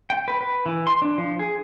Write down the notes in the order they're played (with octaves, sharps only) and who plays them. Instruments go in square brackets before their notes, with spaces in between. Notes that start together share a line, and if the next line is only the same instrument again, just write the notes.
[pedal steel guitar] G5
B4
B4
E3
C6
D4
F3
G#4